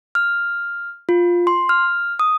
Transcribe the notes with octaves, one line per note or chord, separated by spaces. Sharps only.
F6
F4
C6
F6
D#6